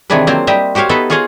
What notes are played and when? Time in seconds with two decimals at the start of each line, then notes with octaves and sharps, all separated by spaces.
0.10 C3 D#3 E3 D4 G#4 B4
0.27 F#3 A#3 C4 F4 C5
0.47 G3 G4 D#5 E5
0.75 F#4 G4 C5 C#5 F5
0.89 B3 D#4 A4 B4 E5
1.10 F4 G#4 C#5 D#5 F5 F#5